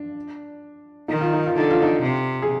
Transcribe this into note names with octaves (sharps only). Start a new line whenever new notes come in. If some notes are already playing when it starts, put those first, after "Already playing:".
Already playing: D4
D#3 D#4
F4
D#4
F4
D3 D#4
F4
D#4
C3
G#4